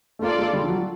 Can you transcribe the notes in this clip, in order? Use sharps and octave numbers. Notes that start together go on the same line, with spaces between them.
A3
A#3 F4 A4 D5
G#3
G3
F3
F#3